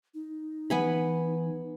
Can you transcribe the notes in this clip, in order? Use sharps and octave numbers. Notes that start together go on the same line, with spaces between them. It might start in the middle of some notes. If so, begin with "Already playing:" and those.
D#4
E3 B3 G#5 B5